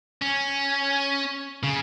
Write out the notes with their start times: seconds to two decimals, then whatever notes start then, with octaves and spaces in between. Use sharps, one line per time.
0.22 C#4
1.63 C#3